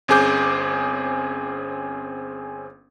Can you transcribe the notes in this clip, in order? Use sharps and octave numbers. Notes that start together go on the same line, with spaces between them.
G1 C4 C#4 G#4 D6 G6